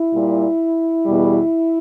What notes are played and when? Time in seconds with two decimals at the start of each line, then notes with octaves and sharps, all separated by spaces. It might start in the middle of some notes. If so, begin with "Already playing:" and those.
Already playing: E4
0.12 A#2 G3
1.06 E2 B2 G3